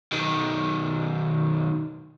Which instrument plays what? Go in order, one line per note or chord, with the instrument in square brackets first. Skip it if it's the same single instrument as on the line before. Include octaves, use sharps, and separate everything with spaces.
[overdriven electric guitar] B1 D#3